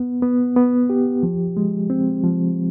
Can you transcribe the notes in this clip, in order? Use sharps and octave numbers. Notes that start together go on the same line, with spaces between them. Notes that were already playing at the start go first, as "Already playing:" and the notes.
Already playing: B3
B3
B3
G4
F3
G#3
C4
F3